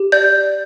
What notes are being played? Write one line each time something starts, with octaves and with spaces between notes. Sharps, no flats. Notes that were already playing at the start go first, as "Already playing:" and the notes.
Already playing: G4
D5 G6